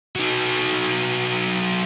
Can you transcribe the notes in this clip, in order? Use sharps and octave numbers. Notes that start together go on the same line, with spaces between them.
F#3 D#4